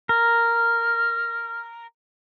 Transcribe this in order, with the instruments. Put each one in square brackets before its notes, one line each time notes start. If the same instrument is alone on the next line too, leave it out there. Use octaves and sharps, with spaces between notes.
[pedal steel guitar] A#4 [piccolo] F6